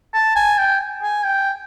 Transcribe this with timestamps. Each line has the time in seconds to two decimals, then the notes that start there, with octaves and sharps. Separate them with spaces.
0.14 A5
0.36 G#5
0.58 G5
1.03 G#5
1.25 G5